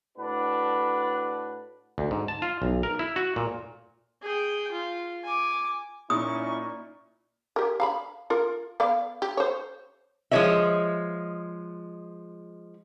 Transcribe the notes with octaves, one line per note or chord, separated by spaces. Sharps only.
A2 D4 F#4 B4
D2
G#2
A5
F4
B1
A#4
E4
F#4
A#2
G#4 G5
F4
G#5 D6
A#2 A#3 C#4 D#4 E4 C#6 D#6
G4 A#4
F5 A#5 B5
F4 A#4
B3 D5 F5
G4
C5 C#5
F3 G#3 G#4 C#5 D#5 E5